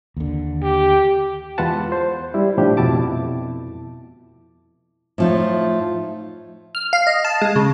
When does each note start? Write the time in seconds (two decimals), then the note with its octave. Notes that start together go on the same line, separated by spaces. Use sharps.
0.17 D#2 D3
0.63 G4
1.58 E2 G#3 F4 B4 F#5 A5
1.92 C5
2.34 G3 E4
2.58 A2 F3 D4 G4
2.77 F2 B2 E4 A5 D6
5.18 A2 F3 D#4
6.75 F6
6.93 F5
7.07 D#5
7.25 A5
7.41 G#3
7.56 C#3